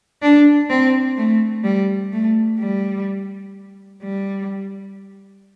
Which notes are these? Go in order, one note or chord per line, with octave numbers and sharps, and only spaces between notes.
D4
C4
A3
G3
A3
G3
G3